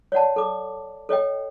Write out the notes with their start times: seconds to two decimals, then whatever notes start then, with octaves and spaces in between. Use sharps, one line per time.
0.12 C#5 D5 F#5 A5
0.36 A4 D6
1.09 A4 C#5 D#5 G5